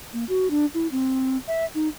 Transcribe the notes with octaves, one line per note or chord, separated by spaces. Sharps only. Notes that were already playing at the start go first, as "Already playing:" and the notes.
A#3
F#4
D4
E4
C4
E5
D#4